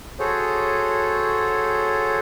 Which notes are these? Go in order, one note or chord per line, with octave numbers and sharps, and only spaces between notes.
F#4 G#4 A4 C5 C#5